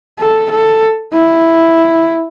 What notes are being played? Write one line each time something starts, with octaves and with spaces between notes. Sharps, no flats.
A4
A4
E4